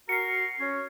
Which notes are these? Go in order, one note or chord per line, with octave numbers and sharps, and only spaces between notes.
F#4 A#4 C7 C#7
C#4